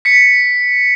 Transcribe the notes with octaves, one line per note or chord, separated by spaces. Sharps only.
B6 C#7